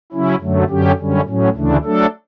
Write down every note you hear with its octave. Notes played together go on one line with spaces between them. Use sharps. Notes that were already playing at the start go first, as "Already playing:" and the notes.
C#3 F#3 C#4 E4
F#2 D3 F#3 A3
F#2 D3 F#3 C#4 G4
F#2 D3 G3 C#4
A2 F#3 C#4
D2 C#3 E3 A3 D4
F#3 A3 D4 A4